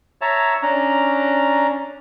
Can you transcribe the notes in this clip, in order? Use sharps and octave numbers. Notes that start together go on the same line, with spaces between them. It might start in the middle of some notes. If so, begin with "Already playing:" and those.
C#5 E5 A5 A#5
C#4 D4 A#5